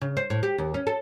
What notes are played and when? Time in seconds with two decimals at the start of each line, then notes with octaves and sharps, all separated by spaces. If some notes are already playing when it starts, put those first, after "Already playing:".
0.01 C#3
0.17 C5
0.30 A2
0.43 G4
0.58 D#2
0.74 C#4
0.87 A4